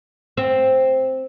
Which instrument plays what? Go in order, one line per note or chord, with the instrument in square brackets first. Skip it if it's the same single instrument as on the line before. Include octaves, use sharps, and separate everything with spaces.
[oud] C4